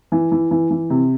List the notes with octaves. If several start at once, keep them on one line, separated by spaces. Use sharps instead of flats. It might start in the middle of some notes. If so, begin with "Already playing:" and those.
E3
E3
E3
E3
C3